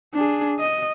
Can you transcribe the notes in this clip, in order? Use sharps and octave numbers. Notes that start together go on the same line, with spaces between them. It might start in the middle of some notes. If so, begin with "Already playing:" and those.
D4 G#4
D#5